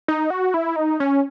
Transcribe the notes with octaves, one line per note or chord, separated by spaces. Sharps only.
D#4
F#4
E4
D#4
C#4